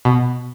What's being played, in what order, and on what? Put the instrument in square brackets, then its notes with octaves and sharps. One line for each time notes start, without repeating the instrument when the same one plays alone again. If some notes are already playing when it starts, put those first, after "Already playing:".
[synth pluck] B2